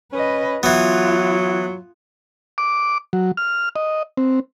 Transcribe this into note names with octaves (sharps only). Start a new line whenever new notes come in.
C#4 B4 D#5
E3 F#3 B3 F4
D6
F#3
F6
D#5
C4